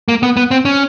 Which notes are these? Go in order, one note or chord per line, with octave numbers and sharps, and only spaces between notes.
A#3
B3
B3
C4
C#4